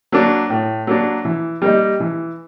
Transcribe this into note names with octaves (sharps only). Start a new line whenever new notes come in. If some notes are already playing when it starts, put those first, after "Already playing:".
F#3 A#3 D4
A2
F#3 A#3 D4
E3
G3 A#3 D#4
E3